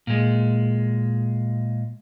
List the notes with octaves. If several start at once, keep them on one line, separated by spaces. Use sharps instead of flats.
A#2 G#3